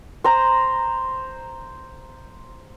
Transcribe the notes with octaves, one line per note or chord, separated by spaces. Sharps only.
C5 A#5